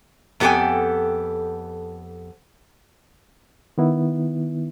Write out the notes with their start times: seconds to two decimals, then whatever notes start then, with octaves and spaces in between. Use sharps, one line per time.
0.40 F2 B3 G4 A4 G5 G#5
3.78 D#3 B3 E4